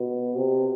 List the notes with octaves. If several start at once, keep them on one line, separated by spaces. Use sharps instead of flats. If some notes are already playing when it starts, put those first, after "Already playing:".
Already playing: B2
C3